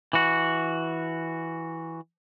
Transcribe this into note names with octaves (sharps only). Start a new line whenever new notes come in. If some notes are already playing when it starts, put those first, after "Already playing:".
E3 F#4